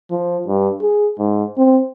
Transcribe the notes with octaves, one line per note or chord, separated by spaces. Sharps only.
F3
G2
G#4
G#2
C4